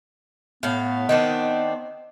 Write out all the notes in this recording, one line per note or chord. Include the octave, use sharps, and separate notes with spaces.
A2 B3 F5
D#3 C4 D4 D#5